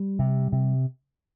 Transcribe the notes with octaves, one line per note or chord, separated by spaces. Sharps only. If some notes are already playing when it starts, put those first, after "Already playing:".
Already playing: G3
C3
C3